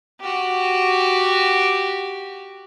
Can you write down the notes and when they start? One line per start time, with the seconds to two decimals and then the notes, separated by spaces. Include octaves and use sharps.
0.20 F#4 G4